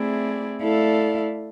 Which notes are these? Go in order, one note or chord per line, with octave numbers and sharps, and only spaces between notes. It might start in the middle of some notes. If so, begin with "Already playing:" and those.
Already playing: A3 C4 E4 G#4 D5
A3 E4 A4 D5 F5